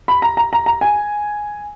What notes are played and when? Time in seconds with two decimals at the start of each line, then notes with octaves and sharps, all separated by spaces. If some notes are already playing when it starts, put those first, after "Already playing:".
0.08 B5
0.22 A#5
0.37 A#5
0.53 A#5
0.66 A#5
0.81 G#5